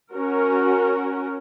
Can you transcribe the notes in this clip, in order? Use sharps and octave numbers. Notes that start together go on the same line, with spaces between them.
C#4 F#4 A#4